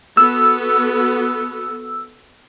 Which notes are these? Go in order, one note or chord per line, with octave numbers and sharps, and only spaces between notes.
B3 F#4 A4 E6